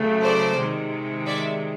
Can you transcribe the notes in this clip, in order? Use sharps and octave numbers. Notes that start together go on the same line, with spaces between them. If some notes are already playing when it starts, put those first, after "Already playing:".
Already playing: C#3 F#3 A3
C5 D5
C3 D#3 G#3
D5 E5